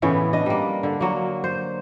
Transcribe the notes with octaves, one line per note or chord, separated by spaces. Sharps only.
A2 C#3 E3 B3
D4 D#5
G3 A#3
D3
F#3 A#3
C5